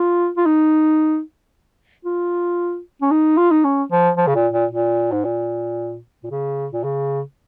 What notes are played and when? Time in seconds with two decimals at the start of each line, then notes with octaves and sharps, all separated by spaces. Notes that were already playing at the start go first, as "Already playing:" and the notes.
Already playing: F4
0.37 F4
0.45 D#4
2.05 F4
3.02 C#4
3.11 D#4
3.37 F4
3.51 D#4
3.64 C#4
3.92 F3
4.17 F3
4.27 C#3
4.35 A#2
4.53 A#2
4.71 A#2
5.12 G#2
5.24 A#2
6.23 A#2
6.30 C#3
6.73 A#2
6.84 C#3